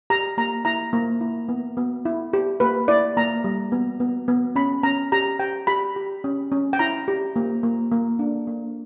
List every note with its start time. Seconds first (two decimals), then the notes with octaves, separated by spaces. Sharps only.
0.10 G4 A#5
0.38 A#3 A#5
0.65 E4 A#5
0.93 A#3
1.21 E4
1.49 B3
1.77 B3
2.05 E4
2.33 G4
2.60 A#3 B4
2.88 E4 D5
3.17 A#3 A#5
3.44 G3
3.72 B3
4.00 B3
4.28 B3
4.56 C#4 B5
4.83 C#4 A#5
5.12 G4 A#5
5.40 G4 G5
5.67 G4 B5
5.96 G4
6.24 C#4
6.52 C#4
6.73 G5
6.79 E4 A#5
7.08 G4
7.36 A#3
7.63 A#3
7.92 A#3
8.19 D4
8.47 A#3